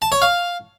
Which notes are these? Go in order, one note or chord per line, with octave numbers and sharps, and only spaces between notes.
A5
C#5
F5